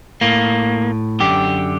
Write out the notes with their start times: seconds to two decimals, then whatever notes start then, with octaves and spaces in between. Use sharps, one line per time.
0.21 A2 A#3
1.20 F#2 D3 G4